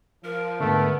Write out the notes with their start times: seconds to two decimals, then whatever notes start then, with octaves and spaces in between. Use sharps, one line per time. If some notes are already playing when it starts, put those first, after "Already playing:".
0.24 F3 A#4
0.60 G#2 D3 A3 B3